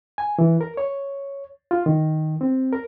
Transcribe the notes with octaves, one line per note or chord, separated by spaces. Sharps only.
G#5
E3
A#4
C#5
F4
D#3
C4
A#4